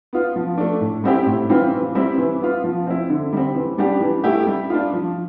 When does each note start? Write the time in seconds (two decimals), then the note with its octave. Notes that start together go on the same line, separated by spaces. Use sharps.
0.13 B3 F4
0.36 F3
0.58 A3 D4
0.81 A2
1.04 G3 C4 E4 G4
1.27 A2
1.49 E3 G3 C4 F4
1.72 E3
1.95 G3 C4 E4
2.18 E3
2.41 B3 F4
2.64 F3
2.87 C4 E4
3.10 D3
3.33 G3 C4
3.55 E3
3.78 G3 D4 G4
4.01 E3
4.24 A3 E4 G4
4.47 G3
4.70 D4 F4
4.92 F3